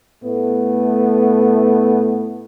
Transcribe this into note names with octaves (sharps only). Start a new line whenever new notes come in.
A2 A3 B3